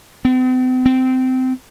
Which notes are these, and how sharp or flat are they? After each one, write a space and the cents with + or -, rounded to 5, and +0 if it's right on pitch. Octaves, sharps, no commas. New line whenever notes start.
C4 -45
C4 -20